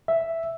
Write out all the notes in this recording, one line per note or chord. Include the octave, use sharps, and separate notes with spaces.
E5